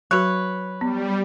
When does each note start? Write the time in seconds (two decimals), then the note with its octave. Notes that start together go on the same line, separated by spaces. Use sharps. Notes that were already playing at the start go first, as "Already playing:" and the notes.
0.11 F#3 F#4 B4 C#5
0.81 G3 B3